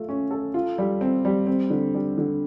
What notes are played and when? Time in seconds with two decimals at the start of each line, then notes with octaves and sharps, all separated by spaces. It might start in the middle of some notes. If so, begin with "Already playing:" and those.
Already playing: A3 F4
0.09 C#4
0.31 A4
0.54 F4
0.78 G3
1.01 C4
1.25 G3
1.47 C4
1.70 D3
1.94 G3
2.18 D3